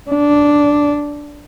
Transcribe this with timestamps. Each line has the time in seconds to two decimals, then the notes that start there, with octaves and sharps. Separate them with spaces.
0.11 D4